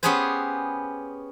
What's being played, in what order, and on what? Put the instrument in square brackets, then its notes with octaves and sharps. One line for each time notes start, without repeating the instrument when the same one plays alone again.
[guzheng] B3 C#4 G4 G#4 B4 C5